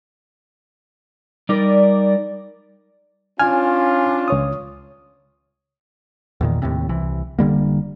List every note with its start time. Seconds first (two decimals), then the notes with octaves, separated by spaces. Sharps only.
1.49 G3 D#4 A#4 D5
3.39 C#4 D4 F4 G#5 F6
4.28 C#2 C#5 D#6
6.41 E2 A#2 D#3
6.62 D#2 A2 C3
6.89 C2 C3 E3
7.39 F1 D3 G3 A#3